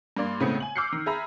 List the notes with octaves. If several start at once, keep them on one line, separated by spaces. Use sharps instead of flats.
G2 A#3 D5 C6
A2 C#3 G#3 A3 B3 C4
G#5 F#7
D6 E6 F6 G6 C7 C#7
D#3
G#4 E5 A#5 B5